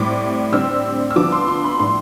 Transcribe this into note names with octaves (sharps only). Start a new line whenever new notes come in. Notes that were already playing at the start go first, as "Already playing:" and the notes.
Already playing: A2 G3 C4 D6
D3 G3 C4 E6
E6
D3 F3 B3 D6
C6
C6
B5
A2 G3 D4 C6